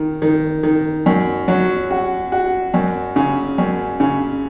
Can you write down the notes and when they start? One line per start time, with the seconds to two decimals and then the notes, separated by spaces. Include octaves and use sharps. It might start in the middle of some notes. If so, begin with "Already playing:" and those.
Already playing: D#3
0.22 D#3
0.63 D#3
1.06 F#2
1.48 F#3
1.91 F#4
2.32 F#4
2.74 F#2
3.16 C#3
3.58 F#2
4.00 C#3